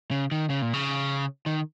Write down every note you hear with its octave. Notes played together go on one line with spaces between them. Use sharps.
C#3
D#3
C#3
A#2
C#3
D#3